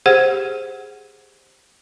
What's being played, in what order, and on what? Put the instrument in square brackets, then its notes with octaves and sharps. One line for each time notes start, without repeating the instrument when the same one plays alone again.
[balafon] G4 G#4 C5 F#5